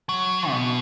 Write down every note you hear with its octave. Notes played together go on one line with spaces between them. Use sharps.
F#3
B2